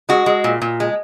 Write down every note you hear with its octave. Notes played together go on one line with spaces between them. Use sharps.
G#3 F#4
G#3
A#2
A#2
G#3